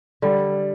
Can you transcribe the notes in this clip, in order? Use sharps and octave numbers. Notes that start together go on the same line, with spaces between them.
D3 G3